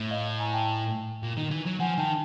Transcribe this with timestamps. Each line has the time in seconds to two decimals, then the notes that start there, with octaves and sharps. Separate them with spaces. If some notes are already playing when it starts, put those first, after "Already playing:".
Already playing: A2
0.11 D#5 F5
0.39 G#5 A#5
0.53 G5 A5
1.23 A#2
1.37 D#3
1.51 E3
1.65 F#3
1.80 F3 F#5 G#5
1.98 D#3 G5 A5